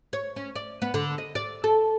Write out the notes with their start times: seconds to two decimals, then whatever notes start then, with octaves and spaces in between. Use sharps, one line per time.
0.13 C#5
0.36 C#4
0.55 D5
0.82 B3
0.94 D3
1.18 D#5
1.35 D5
1.64 A4